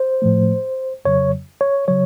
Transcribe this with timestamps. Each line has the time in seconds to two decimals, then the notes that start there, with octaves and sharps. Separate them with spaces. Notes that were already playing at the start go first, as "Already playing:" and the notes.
Already playing: C5
0.22 A2 F3 A3
1.05 F2 C#3 F#3 C#5
1.61 C#5
1.88 C#3 F#3 C#5